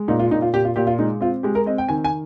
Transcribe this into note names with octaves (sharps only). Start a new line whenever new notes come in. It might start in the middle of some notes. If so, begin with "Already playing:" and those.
Already playing: G#3
A#2 D#4
F4
A#2 D#4
F4
A#2 G4
F4
A#2 G4
F4
G#3 D#4
C4 F4
G#3 G4
A#4
C4 D#5
G5
D#3 G#5
G#5